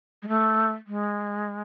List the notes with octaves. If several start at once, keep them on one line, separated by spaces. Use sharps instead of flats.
G#3
A3
G#3